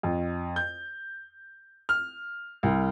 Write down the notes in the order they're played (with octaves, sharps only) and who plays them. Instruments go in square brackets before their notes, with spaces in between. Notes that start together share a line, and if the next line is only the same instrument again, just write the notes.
[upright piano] F2
G6
F6
C2